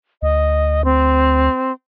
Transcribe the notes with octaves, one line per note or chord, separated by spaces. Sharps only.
D2 D#5
C4